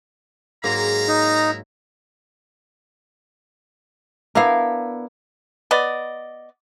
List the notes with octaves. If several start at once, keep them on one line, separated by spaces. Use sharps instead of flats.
G#2 F#3 A#3 E4 F5 A#5
D#4
B3 D4 E4 A#4 F5
B3 D5 D#5